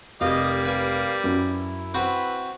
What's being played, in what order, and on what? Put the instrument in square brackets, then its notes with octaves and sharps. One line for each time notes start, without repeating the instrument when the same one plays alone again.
[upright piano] F1 [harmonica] G3 A#3 [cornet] D#5 [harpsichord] F5
[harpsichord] B4 G#5 [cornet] F5
[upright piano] F#2 [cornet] E4
[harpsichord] C4 F#4 [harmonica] B4